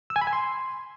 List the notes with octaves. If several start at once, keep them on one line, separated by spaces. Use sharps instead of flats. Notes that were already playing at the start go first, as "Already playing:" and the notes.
E6
G#5
B5
G#5
C6